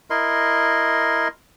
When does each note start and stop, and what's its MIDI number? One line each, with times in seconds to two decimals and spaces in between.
0.10 1.28 64
0.10 1.28 70
0.10 1.28 75
0.10 1.28 84